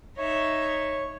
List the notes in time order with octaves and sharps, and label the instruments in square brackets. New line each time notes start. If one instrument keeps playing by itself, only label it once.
[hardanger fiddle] D#4 E5 [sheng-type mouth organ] C#5